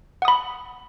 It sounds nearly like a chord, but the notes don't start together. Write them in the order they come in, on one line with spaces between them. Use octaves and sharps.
F#5 D#6 B5